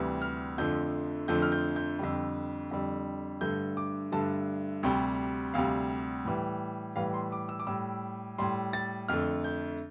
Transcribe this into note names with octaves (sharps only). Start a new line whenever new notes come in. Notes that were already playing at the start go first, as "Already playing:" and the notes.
Already playing: D2 C3 E3 G3
F6
F2 D3 F3 A3 G6
F2 D3 F3 A3 G6
F6
G6
G6
F2 D3 G3
F2 D3 G3
G2 D3 A3 G6
D6
G2 D3 A3 A5
D2 C3 G3 G5
D2 C3 G3 F5
A2 E3 G3
A2 E3 G3 F5
C6
D6
E6
D6
A2 G3 E6
A2 G3 C6
A6
F2 D3 A3 F6
G6